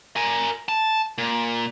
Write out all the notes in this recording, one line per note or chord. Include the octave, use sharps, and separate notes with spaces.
A#4 G#5
A5
A#2